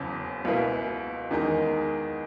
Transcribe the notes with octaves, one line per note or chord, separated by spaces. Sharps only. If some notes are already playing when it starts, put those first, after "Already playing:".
Already playing: F#1 E2 C#3
C#2 B2 A#3 E4 B4
E2 D#3 G#3 D#4